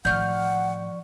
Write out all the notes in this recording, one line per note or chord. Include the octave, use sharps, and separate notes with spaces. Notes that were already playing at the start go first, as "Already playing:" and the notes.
A2 D#3 F3 D5 F#5 C#6 F6 G6